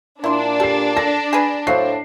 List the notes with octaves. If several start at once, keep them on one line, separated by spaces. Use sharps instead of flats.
A#2 D4 E4 C6
G4 A4 C7
A4 A#6
G#4 B4
A2 F#3 C5 F5 C7